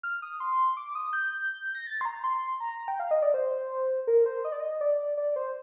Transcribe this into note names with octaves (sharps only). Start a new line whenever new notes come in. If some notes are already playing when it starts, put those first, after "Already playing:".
F6
D#6
C6
D6
D#6
G6
A#6
A6
C6
A#5
C6
A#5
G5
F5
D#5
D5
C5
A#4
C5
D#5
D5
D#5
D5
D5
C5